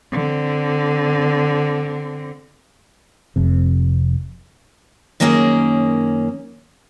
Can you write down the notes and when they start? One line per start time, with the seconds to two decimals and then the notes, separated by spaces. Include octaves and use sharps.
0.12 D3 C4
3.36 F1 F2 C3
5.20 F#2 D#3 A#3 C#4 E4 G#4